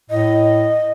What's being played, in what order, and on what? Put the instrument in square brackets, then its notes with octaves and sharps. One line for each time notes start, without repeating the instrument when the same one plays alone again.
[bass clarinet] A2 [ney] D#5